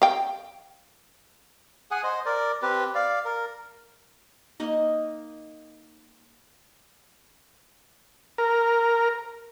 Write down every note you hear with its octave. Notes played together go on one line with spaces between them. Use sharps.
F5 G5
G#4 F#5 G#5
C5 D#5
A#4 D5
C4 G4 B4
D5 F5
A#4
A#3 D#4 D#5
A#4